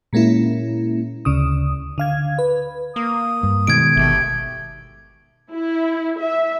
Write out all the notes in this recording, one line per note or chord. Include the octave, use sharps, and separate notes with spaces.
A#2 G#3 A#3 C#4 E4
D2 C#3 D#6
D3 F5 G#6
B4
A#3 D#6
G2
B2 D#3 G#3 G#6 D7
G1 A3 G4
E4
E5